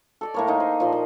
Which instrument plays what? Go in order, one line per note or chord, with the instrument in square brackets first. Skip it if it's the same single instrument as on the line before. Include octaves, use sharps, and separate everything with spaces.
[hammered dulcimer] A4 D5 D#5
A2 A#3 C#5
A#3 D#4
C5
A#2 F3 C6
C5